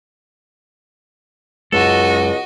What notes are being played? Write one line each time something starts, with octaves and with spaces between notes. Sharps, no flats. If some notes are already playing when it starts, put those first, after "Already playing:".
C#2 F#2 G#3 F#4 A4 D#5